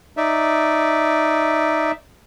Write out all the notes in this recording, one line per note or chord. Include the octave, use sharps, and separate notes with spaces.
D#4 D5 E5